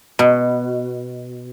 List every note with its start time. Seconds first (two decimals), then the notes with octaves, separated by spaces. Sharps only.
0.19 B2